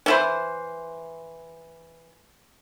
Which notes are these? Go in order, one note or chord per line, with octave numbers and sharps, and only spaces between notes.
E3 E4 C5